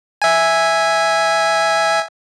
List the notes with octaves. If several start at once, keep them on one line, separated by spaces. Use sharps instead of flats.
E5 G#5